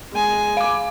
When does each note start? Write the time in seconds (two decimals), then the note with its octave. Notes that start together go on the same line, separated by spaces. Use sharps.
0.13 G#3 G#5
0.57 F5 D6